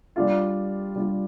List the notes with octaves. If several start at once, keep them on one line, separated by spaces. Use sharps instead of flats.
G3 D4 F4
G3 D4 F4